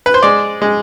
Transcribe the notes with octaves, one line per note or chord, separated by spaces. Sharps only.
B4
C5
G#3 D5
G#3